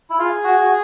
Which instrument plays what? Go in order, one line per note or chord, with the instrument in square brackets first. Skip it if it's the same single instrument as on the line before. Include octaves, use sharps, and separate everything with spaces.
[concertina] E4
[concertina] F4 [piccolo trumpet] G#4
[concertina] F#4
F#4